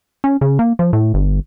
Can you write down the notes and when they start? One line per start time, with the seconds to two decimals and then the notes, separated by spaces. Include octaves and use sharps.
0.24 C#4
0.41 C#3
0.59 A#3
0.79 F3
0.93 A2
1.14 G1